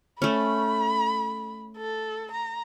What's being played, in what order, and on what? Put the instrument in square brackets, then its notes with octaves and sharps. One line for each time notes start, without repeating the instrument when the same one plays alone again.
[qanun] A3 C#4 [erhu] B5
[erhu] A4
A#5